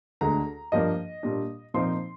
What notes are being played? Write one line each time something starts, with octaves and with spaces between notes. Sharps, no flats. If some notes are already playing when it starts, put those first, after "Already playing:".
D2 D3 G#3 A#5
G2 F3 A#3 D4 D#5
A#2 G3 D4
A#2 F3 C4 D#4 C6